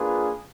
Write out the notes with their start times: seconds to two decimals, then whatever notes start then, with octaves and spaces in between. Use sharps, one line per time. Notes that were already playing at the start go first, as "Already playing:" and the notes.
Already playing: A#3 D4 F4 G#4 B4